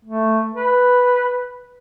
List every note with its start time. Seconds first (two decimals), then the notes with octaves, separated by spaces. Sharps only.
0.05 A3
0.54 B4